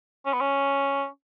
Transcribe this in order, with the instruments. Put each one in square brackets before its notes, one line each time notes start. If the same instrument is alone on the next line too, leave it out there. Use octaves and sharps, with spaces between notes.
[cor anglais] C#4
B3
C#4